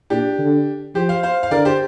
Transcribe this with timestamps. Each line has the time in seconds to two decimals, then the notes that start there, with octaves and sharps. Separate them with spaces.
0.10 A#2 D4 G4
0.39 D3
0.95 F3 G4 C5
1.09 C5 F5
1.23 C5 F5
1.43 F5
1.51 D3 A#4 D5
1.65 G4 C5